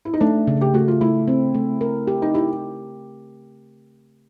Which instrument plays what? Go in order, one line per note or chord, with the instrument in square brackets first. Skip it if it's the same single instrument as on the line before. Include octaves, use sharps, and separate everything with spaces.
[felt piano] E4
D#4
[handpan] A3 [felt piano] D4
[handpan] C#3
[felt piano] G4
[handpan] A3 [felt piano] F#4
[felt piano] F4
[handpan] A3 [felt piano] E4
[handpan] C4
A3
A#4
G4
[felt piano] D#4
[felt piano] E4 [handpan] G4